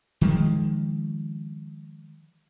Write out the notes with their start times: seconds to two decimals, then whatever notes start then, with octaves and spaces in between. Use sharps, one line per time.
0.21 D#3 F3 G#3